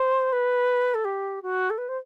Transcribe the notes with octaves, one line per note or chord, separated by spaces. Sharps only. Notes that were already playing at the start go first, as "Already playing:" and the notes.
Already playing: C5
B4
A4
G4
F#4
A4
B4
C5